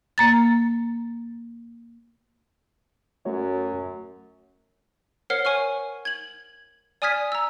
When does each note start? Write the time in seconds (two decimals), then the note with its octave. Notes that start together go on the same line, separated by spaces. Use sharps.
0.18 A#3 A#5 A6
3.26 F#2 A3 F#4 C#5
5.30 A#4 C5 C#5 F#5 F6 C7
5.45 C#5 G#5 C#6 F6
6.05 G#6 F#7
7.02 D5 G#5 D#6 F6 G#6 B6
7.32 A#5 E6